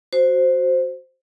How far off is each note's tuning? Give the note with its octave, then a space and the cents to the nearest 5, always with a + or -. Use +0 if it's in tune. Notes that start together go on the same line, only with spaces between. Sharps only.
F#4 +0 C5 +0